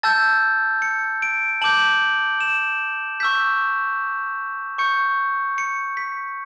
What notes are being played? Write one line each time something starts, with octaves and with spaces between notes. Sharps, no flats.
A5 E6 G6 A6
C#7
D7
A5 D6 G6 F#7
E7
C#6 E6 G6 B6
C#6 G6 C#7
C#7
B6